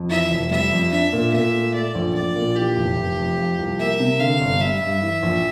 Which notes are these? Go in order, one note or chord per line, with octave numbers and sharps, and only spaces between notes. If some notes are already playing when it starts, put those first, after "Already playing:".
Already playing: F2
E3 E5
F1
G3 E5
F2
D4 E5
A#2
A#2 E5
A3
A3 D5
A#1
A#1 D5
A#2
E3 G4
F1
F1
F2
F3
C2
A#3 E5
C3
D3 F5
G1
G3 E5
G2
E3
A#1